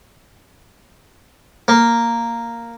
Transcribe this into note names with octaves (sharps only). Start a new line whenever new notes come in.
A#3